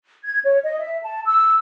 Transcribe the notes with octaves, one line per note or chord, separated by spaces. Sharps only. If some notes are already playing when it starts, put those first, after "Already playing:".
G#6
C#5
D#5
E5
A5
E6